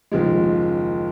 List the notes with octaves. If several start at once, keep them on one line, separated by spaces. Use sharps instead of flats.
F#1 D#2 F3 G#3